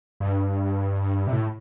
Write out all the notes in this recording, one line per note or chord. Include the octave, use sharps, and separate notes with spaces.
G2
C3
A2